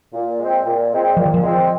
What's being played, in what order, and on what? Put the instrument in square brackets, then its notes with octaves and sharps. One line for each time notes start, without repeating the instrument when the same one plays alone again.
[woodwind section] A#2
G#3 C4
A#2
G#3 C4
[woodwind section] A#2 [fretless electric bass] F3
[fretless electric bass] D#3
F3
[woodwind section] G#3 C4